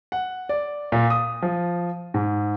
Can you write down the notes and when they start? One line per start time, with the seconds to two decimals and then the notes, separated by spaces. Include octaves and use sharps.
0.12 F#5
0.49 D5
0.92 A#2
1.10 D#6
1.42 F3
2.14 G#2